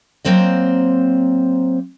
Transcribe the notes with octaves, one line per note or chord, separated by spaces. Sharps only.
F#3 A#3 C4 C5 D#5